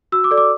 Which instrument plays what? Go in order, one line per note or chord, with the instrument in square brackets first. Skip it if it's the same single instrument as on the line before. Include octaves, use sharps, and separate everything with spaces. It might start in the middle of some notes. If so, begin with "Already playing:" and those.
[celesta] F#4 E6
D6
A4 D5
D6